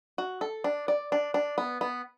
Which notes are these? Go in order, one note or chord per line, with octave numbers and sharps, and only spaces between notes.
F#4
A4
D4
D5
D4
D4
B3
B3